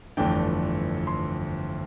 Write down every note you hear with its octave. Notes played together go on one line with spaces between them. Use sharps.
G1 F2 E3 A3 D4 G5
C6